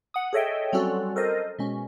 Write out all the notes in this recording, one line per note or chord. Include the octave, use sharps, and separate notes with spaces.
F#5 D#6
G#4 A4 C#5 D#5 E5 G5
F#3 G3 C4 C#4 F#4 A4
A4 A#4 C5 D#5
B2 G#3 C#4